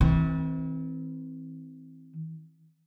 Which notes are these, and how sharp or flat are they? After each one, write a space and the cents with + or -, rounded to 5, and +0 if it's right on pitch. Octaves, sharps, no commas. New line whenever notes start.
E3 -40 C4 +0